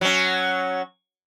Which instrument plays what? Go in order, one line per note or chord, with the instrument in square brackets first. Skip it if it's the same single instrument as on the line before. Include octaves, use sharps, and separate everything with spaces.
[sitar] F#3 C#4